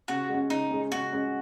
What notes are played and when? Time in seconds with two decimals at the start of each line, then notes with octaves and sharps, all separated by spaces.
0.08 C#3 F#4
0.29 G#3 C#4
0.50 C#3 D#4
0.71 G#3 C#4
0.92 C#3 F#4
1.12 G#3 C#4